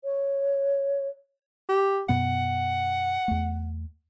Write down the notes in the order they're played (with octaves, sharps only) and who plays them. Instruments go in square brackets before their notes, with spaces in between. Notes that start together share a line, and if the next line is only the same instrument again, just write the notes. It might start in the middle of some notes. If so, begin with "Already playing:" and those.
[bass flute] C#5
[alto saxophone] G4
[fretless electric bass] F#2 B2 B3 [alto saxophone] F#5
[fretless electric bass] E2 A3